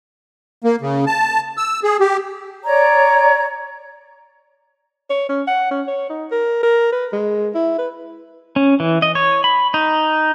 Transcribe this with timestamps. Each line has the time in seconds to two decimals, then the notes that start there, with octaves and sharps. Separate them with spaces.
0.64 A#3
0.81 C#3
1.07 A5
1.57 E6
1.83 G#4
2.00 G4
2.65 C#5 D5 A#5
5.10 C#5
5.29 C#4
5.47 F#5
5.71 C#4
5.87 C#5
6.10 D#4
6.32 A#4
6.63 A#4
6.92 B4
7.13 G#3
7.55 E4
7.78 B4
8.56 C#4
8.80 E3
9.02 D#5
9.15 C#5
9.44 B5
9.74 D#4